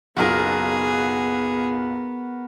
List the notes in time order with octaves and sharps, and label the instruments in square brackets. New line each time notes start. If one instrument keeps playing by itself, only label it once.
[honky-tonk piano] F#1 B1 F4 [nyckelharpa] B3 [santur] F#4 A#4 [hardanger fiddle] G#4